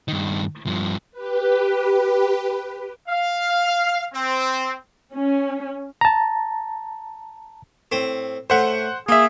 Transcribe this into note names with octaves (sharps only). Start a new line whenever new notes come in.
G2 D#3
G2 F3
G4 B4
F5
C4
C#4
A5 A#5
A2 C4
A2 A3 C5 F#5
A#3 F4 G#4 E5